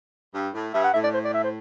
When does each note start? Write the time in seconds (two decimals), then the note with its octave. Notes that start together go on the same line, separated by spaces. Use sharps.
0.33 G2
0.53 A2
0.74 G2 E5
0.84 F#5
0.94 A2 E5
1.04 D5
1.14 C5
1.24 D5
1.34 E5
1.44 C5